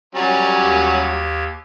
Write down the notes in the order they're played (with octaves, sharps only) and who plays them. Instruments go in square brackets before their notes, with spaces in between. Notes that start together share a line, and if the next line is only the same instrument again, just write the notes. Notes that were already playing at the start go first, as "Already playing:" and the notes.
[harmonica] F#3 G3 C#4 [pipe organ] D5 A#5
[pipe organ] D#2 G4 G#6